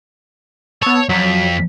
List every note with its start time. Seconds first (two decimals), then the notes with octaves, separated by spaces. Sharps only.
0.82 B3 C#5 A5 E6
1.09 F2 F#3 B6